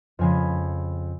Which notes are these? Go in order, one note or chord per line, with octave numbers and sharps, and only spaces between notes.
F2 C#3 F3 G#3 G#5 B5